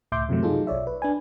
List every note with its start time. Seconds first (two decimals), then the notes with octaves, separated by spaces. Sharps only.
0.12 C#2 A2 E5 C6 D6 G6
0.29 F#2 C3 E3 F#3 A3
0.43 F#3 D#4 F4 G#4 A4
0.67 B1 C#5 D5 E5
0.87 B4
1.02 D4 B4 G#5